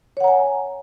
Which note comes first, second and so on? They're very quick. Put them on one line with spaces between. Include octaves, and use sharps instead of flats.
C#5 F#5 A#5 G#5